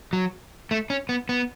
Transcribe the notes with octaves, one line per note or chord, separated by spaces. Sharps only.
F#3
A3
C#4
B3
B3